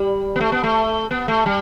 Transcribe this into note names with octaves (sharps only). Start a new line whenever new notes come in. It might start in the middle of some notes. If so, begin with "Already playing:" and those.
Already playing: G3
B3
A3
B3
A3
B3
A3
G3